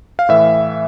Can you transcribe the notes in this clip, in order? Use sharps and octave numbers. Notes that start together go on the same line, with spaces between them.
F5
A2 E3 E5